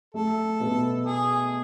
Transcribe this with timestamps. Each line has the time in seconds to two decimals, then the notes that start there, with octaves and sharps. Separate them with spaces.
0.14 A3 A4
0.60 B2 B3
1.06 G#4